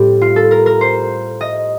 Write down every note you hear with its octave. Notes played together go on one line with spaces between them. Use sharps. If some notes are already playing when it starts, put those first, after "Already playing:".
Already playing: A2 G3 C4 G4
F4
A4
A#4
A#4
C5
D#5